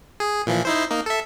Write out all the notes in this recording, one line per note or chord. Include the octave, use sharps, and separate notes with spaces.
G#4
A#2 E3 F3
D#4 E4 C5
A#3 D#4
A4 E5